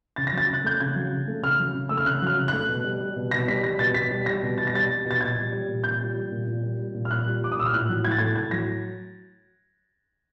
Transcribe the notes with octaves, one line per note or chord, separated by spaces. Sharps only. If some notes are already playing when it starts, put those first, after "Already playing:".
C#3 A6
A#6
F#3 A6
C#3
F#6
A3 G6
C#3 G#6
F#3
C#3
A3
C#3 F6
F#3
C#3
A3 E6
F6
C#3 F#6
F#3 F6
C#3
A3 F#6
B2
G3
G3
B2
B2 A#6
G3 B6
G3 A#6
B2 A6
B2 B6
G3
G3 A#6
B2
B2 A6
A#6
G3 A6
G3
B2
A6
A#2 G#6
G3
G3
A#2
A#2 G6
G3
G3
A#2
A#2
G3
G3
A#2
F6
A#2 F#6
G3
G3 D6
D#6
A#2 E6
F6
A2 F#6
F#3
A2 G#6
A6
A3 G#6
A2 G#6
F#3 A#6